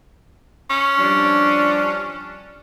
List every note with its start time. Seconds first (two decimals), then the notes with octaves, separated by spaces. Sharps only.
0.70 C#4
0.98 F3 G3 D4